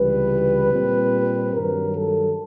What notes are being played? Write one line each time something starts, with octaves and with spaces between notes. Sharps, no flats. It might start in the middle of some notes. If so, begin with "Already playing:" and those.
Already playing: C#2 C3 E3 G3 B4
A#2 G3 C4
G2 D#3 F#3 A#4
A4